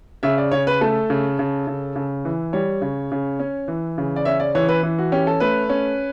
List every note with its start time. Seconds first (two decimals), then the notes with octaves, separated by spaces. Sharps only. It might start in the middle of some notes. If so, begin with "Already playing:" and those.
0.23 C#3 E5
0.38 D5
0.52 C#3 C#5
0.67 B4
0.81 A3 A4
1.10 C#3
1.39 C#3
1.67 C#3
1.96 C#3
2.25 E3
2.53 G3 C#5
2.82 C#3
3.12 C#3
3.40 C#4
3.68 E3
3.98 C#3
4.16 D5
4.25 C#4 E5
4.40 D5
4.55 E3 C#5
4.69 B4
4.83 E3
4.98 F#4
5.12 C#4 G4
5.27 A4
5.40 A3 B4
5.70 C#4